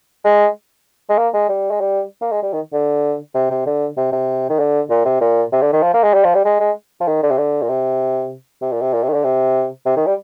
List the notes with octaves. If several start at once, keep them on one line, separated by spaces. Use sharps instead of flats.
G#3
G#3
A#3
G#3
G3
G#3
G3
A#3
G#3
G3
D#3
D3
C3
C3
D3
C3
C3
D#3
D3
A#2
C3
A#2
C3
D3
D#3
F3
A#3
G#3
G3
F3
G3
G#3
G#3
F3
D#3
D3
C3
D3
A#2
C3
C3
A#2
C3
A#2
C3
D#3
D3
C3
C3
D#3
G3